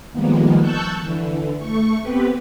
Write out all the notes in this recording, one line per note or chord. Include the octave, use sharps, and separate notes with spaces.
D#3 F3 G3 G#3 A#3 B3
A5 C#6 E6 F#6 G6
D3 E3
A3 C#6
B3 C4 G4 B4